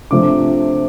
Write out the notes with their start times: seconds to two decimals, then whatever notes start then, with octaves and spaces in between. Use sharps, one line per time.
0.11 C3 F3 A3 D4 D6